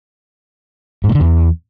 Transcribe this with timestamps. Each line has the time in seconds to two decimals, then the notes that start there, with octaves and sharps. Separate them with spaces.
1.04 G#2
1.09 A#2
1.15 D3
1.20 E2